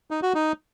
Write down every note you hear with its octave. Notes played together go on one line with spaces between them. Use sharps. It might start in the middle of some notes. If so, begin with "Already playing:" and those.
D#4
F#4
D#4